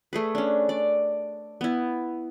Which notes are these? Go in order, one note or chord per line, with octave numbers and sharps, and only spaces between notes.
A3 G#4 B4
C#4 D4
D5
B3 E4